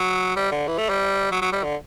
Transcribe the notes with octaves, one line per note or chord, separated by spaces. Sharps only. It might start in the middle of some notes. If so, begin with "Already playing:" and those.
Already playing: F#3
G3
D3
E3
A3
G3
F#3
F#3
G3
D3